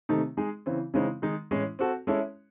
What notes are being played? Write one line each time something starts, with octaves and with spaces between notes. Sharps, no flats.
C3 D#3 A3 D#4
G#3 D#4 G#4
C#3 E3 C4
C#3 E3 G#3 C4 D#4
D#3 G#3 D#4
A2 E3 G#3 C#4
C4 F#4 A4
G#3 C#4 E4 A4 C#5